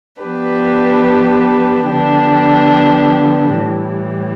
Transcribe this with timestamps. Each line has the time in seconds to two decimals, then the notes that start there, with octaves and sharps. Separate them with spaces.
0.21 F3 B3 D4 G4 B4
1.89 D3 F3 B3 D4 G4
3.56 A2 E3 G3